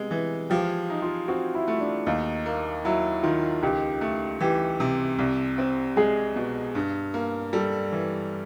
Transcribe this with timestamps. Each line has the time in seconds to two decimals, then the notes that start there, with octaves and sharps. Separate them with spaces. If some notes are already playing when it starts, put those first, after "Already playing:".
Already playing: C3 G#3 B3
0.11 E3
0.50 F3 G4
0.90 D#4
1.02 F4
1.28 C4 F#4
1.55 E4
1.68 A3
1.80 D4
2.07 D#2 D#4
2.46 A#3
2.85 F#3 E4
3.23 D#3 F4
3.63 C#2 G4
4.01 A3
4.40 E3 G4
4.80 C3
5.18 C2
5.58 C4
5.96 G#3 G#4
6.36 B2
6.75 G2
7.14 A#3
7.53 G3 A4
7.92 E3